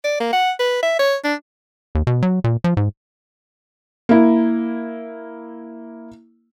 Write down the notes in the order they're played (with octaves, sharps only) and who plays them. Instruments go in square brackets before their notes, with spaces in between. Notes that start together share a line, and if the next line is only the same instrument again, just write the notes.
[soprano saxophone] D5
A#3
F#5
B4
E5
C#5
D4
[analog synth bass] D#2
B2
F#3
A#2
F3
G#2
[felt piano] A#3 E4